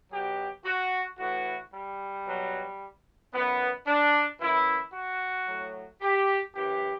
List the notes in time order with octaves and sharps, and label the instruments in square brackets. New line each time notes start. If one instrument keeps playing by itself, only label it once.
[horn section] B2 F#3 G4
F#4
A2 E3 F#4
G3
B2 F#3
F#2 E3 B3
D4
F#2 E3 E4
F#4
A2 F#3
G4
F#2 E3 G4